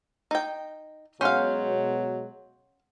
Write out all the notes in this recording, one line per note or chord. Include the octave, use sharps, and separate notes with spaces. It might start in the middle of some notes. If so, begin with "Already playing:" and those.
D#4 G5
B2 F#3 G#3 C#4 F5 F#5 C6 G6